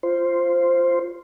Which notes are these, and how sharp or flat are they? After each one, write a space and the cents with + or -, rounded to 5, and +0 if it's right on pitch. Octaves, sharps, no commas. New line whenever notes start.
F4 -10 C5 +0